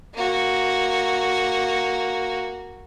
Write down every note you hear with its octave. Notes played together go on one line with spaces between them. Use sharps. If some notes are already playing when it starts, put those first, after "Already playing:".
A#3 F#4